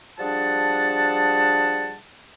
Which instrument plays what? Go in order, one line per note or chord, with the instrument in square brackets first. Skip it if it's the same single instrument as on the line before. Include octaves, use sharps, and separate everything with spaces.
[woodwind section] F3 G3 D4 G#4 F#5 A5